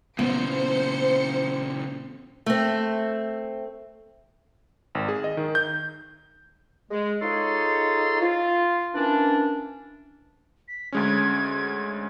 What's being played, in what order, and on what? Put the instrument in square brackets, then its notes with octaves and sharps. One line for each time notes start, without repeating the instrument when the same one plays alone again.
[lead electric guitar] A#2 C#3 [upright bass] B3 [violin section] C5 C#7
[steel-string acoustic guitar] A3 C4
[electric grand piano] G#1
G#4
D#5
D#3
G6
[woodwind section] G#3
D#4 F4 G#4 A4 C#5 C6
F4
E3 A#3 C#4 D4
[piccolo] B6
[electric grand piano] D2 G#3 C#4 [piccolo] G#6